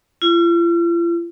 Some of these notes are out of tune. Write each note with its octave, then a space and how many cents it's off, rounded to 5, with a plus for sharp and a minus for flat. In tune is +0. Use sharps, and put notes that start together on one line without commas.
F4 -45